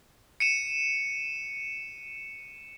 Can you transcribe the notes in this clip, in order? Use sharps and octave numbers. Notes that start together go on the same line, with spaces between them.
C#7 D#7 E7